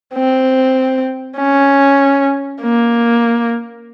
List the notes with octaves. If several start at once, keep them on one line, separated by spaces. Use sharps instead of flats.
C4
C#4
A#3